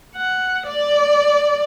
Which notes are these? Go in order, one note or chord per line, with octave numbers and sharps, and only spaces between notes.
F#5
D5